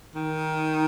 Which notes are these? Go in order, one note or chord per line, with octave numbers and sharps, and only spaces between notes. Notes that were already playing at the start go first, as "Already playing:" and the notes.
D#3